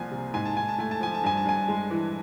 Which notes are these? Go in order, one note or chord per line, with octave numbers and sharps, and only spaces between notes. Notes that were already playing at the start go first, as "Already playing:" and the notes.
Already playing: C2 F3 A#3 G#5
C3
G#2 G#5
A5
G#2 G#5
A5
A3 G#5
A5
F3 G#5
A5
G2 G#5
A5
G2 G#5
G#3
E3